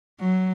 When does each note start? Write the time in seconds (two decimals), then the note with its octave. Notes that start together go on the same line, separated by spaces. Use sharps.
0.20 F#3